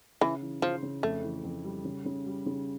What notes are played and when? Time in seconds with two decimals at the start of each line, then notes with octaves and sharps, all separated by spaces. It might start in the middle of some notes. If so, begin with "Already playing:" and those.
0.21 C#3 E3
0.42 E3
0.62 C#3 F3
0.83 C#3
1.03 F2 A3
1.24 E3
1.44 F2
1.65 G3
1.85 C#3
2.05 C#3
2.26 G3
2.46 C#3